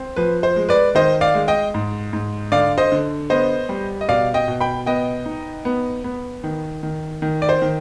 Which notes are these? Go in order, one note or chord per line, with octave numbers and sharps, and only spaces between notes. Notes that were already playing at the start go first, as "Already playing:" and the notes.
Already playing: C4
F3 B4
C5
G#3
B4 D5
D#3 C5 D#5
D5 F5
G#3
D#5 G5
G#2
G#2
D3 D5 F5
C5 D#5
D3
B3 C5 D#5
G3
D#5
B2 D5 F5
D#5 G5
B2
G5 B5
B3 D#5 G5
D#4
B3
B3
D#3
D#3
D#3
D5
C5
D#3